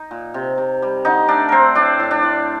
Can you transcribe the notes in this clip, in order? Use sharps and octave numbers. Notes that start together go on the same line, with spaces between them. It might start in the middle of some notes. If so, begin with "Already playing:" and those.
Already playing: D#4 D#5
A#2
C3
C3
G3
D3 D#4 D#5
A3 D4 D5
A3 C4 A#4 C5
A2 D4 D5
A2
D4 D5
A2